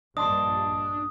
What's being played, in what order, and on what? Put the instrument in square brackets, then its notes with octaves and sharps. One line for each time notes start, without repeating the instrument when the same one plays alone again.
[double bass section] A#1 G2 [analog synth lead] D4 [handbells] D#5 A5 C6 [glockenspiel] D#6